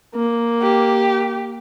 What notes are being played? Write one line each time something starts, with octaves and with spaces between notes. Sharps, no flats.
A#3
G4